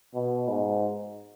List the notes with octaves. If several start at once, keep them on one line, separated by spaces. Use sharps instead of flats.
B2
G#2